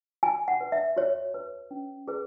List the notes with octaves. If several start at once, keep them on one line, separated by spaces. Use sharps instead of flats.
F#4 G#5
F#5
B4
E5
F#4 C#5
B4
C#4
G#4 B4